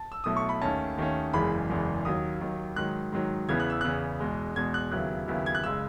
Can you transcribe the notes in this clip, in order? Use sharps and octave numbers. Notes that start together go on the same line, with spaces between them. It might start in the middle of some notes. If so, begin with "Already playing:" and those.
Already playing: A5
E6
B1 B2 A3 E4 D#6
C#6
B5
D#2 D#3 A3 C#4 A5
D#2 D#3 A3 C#4
F#1 E2 C#3 E3 G#3 B5
F#1 E2 C#3 E3 G#3
D#2 D#3 F#3 D#6
D#2 D#3 F#3
G#2 D#3 F#3 F#6
G#2 D#3 F#3
E2 C#3 E3 B3 G#6
F#6
E6
E2 C#3 E3 B3 F#6
E2 B2 G#3
E2 B2 G#3 G#6
F#6
D#2 C#3 F#3 B3 E4 F#6
D#2 C#3 F#3 B3 E4
G#6
F#6
F#1 C#3 G#3 E6